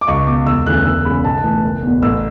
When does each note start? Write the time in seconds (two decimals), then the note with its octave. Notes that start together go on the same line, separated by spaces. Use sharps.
0.01 D6
0.07 C#2 C#6
0.27 B2 D6
0.46 E1 E6
0.66 D2 C#3 E3 F#6
0.86 E1 E6
1.05 E2 C#3 B5
1.24 B1 A5
1.37 A5
1.44 A2 E3
1.64 F#1
1.82 E2 B2
2.02 A1 E6